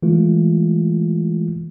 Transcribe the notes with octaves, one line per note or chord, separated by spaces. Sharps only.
E3 G#3 A3 F4